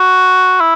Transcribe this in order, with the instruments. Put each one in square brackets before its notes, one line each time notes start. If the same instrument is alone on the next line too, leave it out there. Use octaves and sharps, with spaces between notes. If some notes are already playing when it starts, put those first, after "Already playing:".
Already playing: [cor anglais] F#4
E4